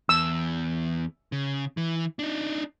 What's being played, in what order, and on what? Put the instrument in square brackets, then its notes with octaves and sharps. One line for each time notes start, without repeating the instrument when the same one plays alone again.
[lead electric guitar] E2 [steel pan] E6
[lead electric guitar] C#3
E3
D4 D#4